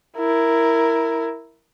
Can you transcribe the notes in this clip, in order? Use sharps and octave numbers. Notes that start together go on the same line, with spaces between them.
E4 A#4